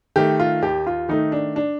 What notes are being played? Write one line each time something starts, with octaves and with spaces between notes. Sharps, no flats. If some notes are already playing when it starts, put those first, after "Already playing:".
D#3 A3 G4
F4
D#2 G4
F4
D#3 A3 D#4
D4
D4